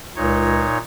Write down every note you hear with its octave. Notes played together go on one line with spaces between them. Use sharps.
C#2 A#2 D#4 C#5